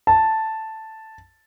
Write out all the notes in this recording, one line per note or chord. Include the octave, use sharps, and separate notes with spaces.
A5